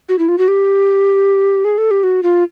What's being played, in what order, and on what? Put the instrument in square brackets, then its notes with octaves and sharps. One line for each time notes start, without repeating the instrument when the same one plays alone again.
[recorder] F#4
E4
F4
F#4
G4
G#4
A4
G4
F#4
F4